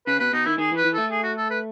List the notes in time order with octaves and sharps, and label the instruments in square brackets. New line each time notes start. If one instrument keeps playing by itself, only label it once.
[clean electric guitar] C#3 [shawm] B4
[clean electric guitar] B2 [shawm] B4
[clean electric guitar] B2 [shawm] D#4
[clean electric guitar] D#3 [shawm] E4
[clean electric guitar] D#3 [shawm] G#4
[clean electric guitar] E3
[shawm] B4
[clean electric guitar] E3
[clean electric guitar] A3 [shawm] A4
[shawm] G#4
F#4
A4
B4